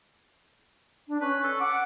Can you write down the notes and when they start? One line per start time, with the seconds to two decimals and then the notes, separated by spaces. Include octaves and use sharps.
1.08 D4
1.21 C#4 B4
1.44 A4
1.60 F#5 D6